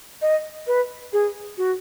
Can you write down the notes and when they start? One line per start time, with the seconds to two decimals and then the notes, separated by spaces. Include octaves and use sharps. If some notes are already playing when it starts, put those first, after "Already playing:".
0.22 D#5
0.67 B4
1.13 G#4
1.58 F#4